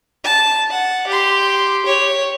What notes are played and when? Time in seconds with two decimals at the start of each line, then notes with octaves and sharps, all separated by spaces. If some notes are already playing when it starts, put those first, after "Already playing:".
0.24 A5
0.71 F#5
1.07 G4 C6
1.86 C#5